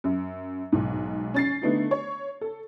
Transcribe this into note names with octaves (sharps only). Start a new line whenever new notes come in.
F#2
B1 G#2
C#4 A6 C7
D3 A3 B3 D#4
C#5
A4